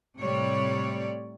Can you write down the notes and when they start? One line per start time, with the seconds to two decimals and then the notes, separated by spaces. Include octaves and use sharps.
0.18 A2 C3 G3 C#5 D5